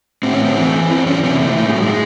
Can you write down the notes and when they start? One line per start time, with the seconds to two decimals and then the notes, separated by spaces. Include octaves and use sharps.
0.23 A2 C4
0.33 C#4
0.45 C4
0.57 E3
0.90 E2 C4
1.07 C#4
1.24 C3 E3 C4
1.41 A3
1.57 A2 A3
1.66 G#3
1.74 F#3
1.82 G#3